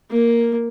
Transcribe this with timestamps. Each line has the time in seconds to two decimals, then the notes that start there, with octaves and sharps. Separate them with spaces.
0.11 A#3